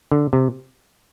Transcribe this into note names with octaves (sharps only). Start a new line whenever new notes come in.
D3
C3